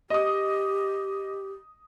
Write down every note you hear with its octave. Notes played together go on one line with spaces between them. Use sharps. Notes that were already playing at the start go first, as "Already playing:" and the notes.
G4 D#5 D#6